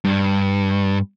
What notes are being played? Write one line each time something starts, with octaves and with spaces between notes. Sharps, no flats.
G2